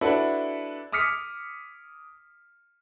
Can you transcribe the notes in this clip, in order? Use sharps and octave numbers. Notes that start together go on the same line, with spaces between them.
D4 E4 F#4 A4 B4
D6 D#6 F6 B6 C#7